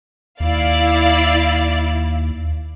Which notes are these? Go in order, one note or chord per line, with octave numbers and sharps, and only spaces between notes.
D#2 E4 D5 F5